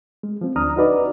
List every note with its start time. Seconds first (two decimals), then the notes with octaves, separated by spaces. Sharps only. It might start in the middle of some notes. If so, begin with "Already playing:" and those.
0.23 G#3
0.41 F3 C4
0.56 D2 D4 A#5 D#6 F6
0.76 D#4 F#4 B4 D5 D#5